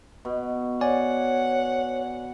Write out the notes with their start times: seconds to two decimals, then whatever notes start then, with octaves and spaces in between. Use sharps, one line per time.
0.25 B2
0.81 C#5 D5 F#5 G#5